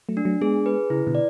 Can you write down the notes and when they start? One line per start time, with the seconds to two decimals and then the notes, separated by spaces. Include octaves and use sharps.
0.09 F#3 A3
0.17 D4
0.25 F#3 A3
0.41 G#3 B3 G#4
0.66 B4
0.90 C#3 E4
1.07 B2 D3
1.15 D5